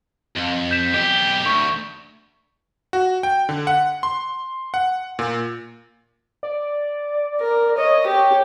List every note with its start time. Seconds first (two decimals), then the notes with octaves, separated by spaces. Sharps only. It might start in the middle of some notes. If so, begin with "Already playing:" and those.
0.36 F2
0.71 G6 B6 E7
0.94 B1 G4
1.46 D2 C#6
2.93 F#4
3.23 G5
3.49 D3
3.67 F#5
4.03 C6
4.74 F#5
5.19 A#2
6.43 D5
7.40 A#4
7.77 C#5 D#5
8.06 G4